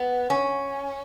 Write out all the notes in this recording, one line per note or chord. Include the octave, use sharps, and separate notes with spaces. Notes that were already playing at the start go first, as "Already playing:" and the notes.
Already playing: B3
C#4